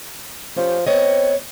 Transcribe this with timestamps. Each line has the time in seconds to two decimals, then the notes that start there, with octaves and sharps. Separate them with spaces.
0.57 F3 C#4 G4
0.87 B3 C4 C#5 D#5